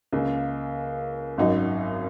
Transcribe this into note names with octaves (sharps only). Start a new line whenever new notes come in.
C#2 C#3 A#3
G#1 F#2 F#3 D#4